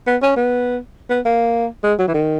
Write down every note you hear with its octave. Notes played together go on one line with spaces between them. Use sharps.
B3
C#4
B3
B3
A#3
G#3
F#3
E3
D#3